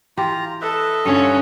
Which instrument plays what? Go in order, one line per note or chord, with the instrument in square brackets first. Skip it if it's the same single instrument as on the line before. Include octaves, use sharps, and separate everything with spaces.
[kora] E3 G4 [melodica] F4 A#5
[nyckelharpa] A4 [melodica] B4 D#5 E5
[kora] G2 D3 F4 [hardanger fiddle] C#4